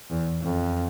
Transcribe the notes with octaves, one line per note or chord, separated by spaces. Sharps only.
E2
F2